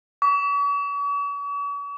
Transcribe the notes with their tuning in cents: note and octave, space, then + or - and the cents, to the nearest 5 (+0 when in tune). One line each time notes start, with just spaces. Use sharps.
C#6 +45